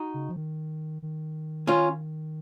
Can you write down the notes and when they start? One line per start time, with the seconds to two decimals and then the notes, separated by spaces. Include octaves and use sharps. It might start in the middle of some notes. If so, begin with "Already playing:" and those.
Already playing: D#4 F#4
0.14 C#3
0.29 F3
0.36 D#3
1.02 D#3
1.67 C#4 F4